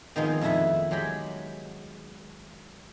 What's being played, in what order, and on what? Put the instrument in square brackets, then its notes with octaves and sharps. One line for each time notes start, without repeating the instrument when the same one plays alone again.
[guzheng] D#3 F3 G#3 B3 C4 D#4
F2 D#3 A3 E4 E5 F#5
F#3 G#3 G4 G5 B5